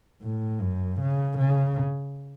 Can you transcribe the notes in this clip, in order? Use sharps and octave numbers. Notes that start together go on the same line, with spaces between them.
A2
F#2
C#3
C#3